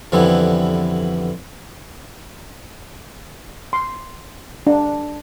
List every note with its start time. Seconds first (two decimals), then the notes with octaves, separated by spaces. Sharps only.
0.12 F2 D3 E3 G3 B3 E4
3.73 C6
4.67 D4